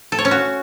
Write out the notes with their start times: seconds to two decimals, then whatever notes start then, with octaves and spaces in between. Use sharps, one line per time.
0.12 A4
0.18 C#5
0.25 C#4
0.31 F#4